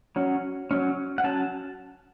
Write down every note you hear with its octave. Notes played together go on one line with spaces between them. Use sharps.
F#3 C#4
F#3 C#4
F#5
F#3 C#4 A5